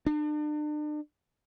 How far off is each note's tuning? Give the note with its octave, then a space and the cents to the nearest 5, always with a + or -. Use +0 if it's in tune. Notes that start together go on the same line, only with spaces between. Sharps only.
D4 +40